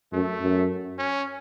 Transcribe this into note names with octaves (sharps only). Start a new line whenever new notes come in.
F#2 A3
F#2
C#4